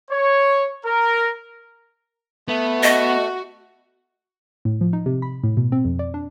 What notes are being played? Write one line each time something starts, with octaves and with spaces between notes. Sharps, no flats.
C#5
A#4
A3 B3
F#4 D#5
A2
F3
D#4
C3
B5
A2
B2
C4
F2
D5
D4